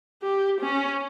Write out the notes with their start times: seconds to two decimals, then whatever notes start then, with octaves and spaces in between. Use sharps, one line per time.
0.22 G4
0.61 C#4